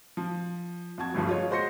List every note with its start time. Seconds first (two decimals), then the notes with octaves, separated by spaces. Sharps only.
0.17 F3
0.98 F2 F#4 A5 G#6
1.14 G1 D2 G2 F3
1.27 G#3 F4 C#5
1.50 G#3 F#4 C5 C6 A#6 C#7